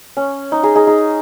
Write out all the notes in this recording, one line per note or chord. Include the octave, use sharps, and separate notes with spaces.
C#4
D#4
D#4 G#4
D#4 G#4
D#4 G#4